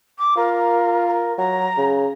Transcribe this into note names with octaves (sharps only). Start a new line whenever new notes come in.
D6
F4 A#4
A#4
F#3 A#5
C#3